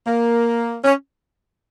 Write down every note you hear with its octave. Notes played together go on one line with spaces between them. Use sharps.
A#3
C#4